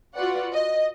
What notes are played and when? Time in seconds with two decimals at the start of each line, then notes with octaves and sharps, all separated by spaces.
0.15 F4 F#4 B4 D5 F#5
0.54 D#5